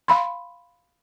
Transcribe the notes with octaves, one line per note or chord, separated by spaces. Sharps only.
F5 B5 C6